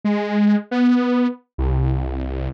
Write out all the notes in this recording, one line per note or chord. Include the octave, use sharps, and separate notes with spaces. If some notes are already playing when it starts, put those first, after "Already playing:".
G#3
B3
C2